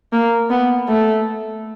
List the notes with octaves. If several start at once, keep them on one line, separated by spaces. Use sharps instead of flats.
A#3
B3
A3